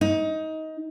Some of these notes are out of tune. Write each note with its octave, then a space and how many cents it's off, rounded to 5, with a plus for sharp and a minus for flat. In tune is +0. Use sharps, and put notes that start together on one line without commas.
D#4 +20